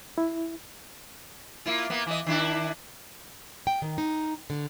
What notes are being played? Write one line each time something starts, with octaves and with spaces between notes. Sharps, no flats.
E4
A#3 E4 F4
A#3 B3
E3 D#5
D#3 D4 E4
G5
D#3
D#4
D3